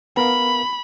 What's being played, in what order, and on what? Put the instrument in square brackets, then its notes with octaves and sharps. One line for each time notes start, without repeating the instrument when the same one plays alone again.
[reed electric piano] B3 A#4 F5 [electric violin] B5